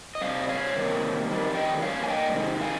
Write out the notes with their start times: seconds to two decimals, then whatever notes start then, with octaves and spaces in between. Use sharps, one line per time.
0.15 D#5
0.21 C3 G3 F5
0.42 D#5
0.49 C#5 F5
0.75 C3 D#3 G3 A#3
1.28 F2 D#3 G3
1.55 D#5 G5
1.81 G2 G3 A#3 C#5 F5
2.03 G#5
2.08 D#5 G5
2.34 C3 D#3 G#3
2.61 F5 G#5